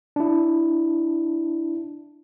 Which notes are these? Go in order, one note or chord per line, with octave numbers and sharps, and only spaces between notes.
D4 E4